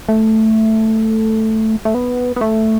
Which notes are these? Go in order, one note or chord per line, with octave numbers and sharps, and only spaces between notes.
A3
A3
B3
B3
A3